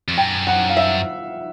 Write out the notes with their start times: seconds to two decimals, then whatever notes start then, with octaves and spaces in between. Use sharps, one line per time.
0.08 F2
0.17 F#2 G5
0.47 F#5
0.70 F5
0.77 E5